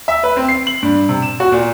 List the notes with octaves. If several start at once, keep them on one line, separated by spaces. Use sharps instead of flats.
E5
B4
C4
C7
F#7
G2
C3
E7
F#4
A#2